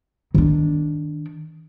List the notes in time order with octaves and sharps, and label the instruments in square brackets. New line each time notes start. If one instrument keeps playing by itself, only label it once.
[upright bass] D#3 D4